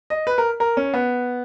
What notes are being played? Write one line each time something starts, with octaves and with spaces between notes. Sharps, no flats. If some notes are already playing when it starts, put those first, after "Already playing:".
D#5
B4
A#4
A#4
C#4
B3